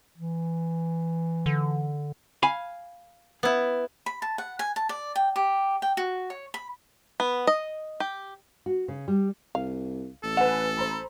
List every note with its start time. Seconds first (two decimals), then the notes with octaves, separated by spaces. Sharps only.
0.18 E3
1.46 D3
2.43 F5 G#5 B5
3.43 B3 E4
4.06 B5
4.22 A5
4.38 F#5
4.59 G#5
4.76 A5
4.89 D5
5.16 G5
5.36 G4
5.82 G5
5.97 F#4
6.30 C#5
6.54 B5
7.20 B3
7.47 D#5
8.00 G4
8.66 F#4
8.88 C#3
9.08 G3
9.55 C2 F5
10.23 A1 A4
10.37 B4 F#5 G#5 E7
10.77 C5 A#5 B5